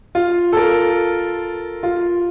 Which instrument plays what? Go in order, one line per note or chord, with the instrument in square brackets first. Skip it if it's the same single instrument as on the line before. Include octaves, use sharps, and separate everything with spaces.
[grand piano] F4
A4
A#4
F4